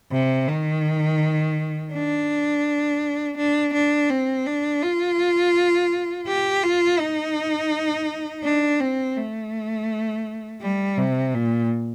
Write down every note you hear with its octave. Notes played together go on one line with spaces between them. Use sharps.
C3
D#3
D4
D4
D4
C4
D4
F4
G4
F4
D#4
D4
C4
A3
G3
C3
A#2